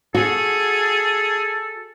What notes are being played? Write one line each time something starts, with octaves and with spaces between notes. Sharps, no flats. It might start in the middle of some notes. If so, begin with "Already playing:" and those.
F#4 G#4 A4